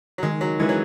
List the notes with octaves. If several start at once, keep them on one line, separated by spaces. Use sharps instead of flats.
F#3
D#3 G#3
F#3
E3 G#3 C#4 E4 B4
F#3